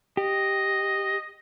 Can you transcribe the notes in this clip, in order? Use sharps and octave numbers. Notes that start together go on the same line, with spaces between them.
G4 D#5